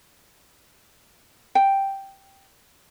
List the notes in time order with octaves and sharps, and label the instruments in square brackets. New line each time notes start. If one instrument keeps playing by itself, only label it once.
[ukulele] G5